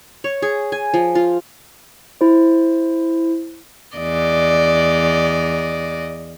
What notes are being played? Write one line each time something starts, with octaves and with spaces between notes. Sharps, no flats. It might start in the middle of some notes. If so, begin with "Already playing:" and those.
C#5
G#4
G#5
F3
F4
E4 C5
E2 D5 D#5